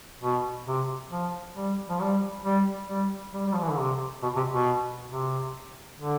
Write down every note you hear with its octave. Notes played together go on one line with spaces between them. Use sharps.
B2
C3
F3
G3
F3
G3
G3
G3
G3
G3
F3
E3
D3
C3
B2
C3
B2
C3
D3